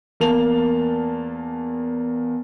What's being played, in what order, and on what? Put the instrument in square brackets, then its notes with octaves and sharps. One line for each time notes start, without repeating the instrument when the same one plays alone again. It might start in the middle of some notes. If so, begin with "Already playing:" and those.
[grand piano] E2 A#3 A5 F7